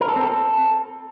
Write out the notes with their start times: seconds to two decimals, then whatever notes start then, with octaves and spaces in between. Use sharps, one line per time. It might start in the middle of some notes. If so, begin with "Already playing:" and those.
0.01 A#4
0.08 A4
0.16 C4
0.24 A4